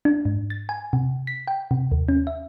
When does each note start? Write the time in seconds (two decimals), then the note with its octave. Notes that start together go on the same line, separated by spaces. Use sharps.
0.05 D4
0.25 G#2
0.50 A6
0.69 G#5
0.93 C3
1.27 B6
1.47 G5
1.71 C3
1.92 D#2
2.09 C#4
2.27 E5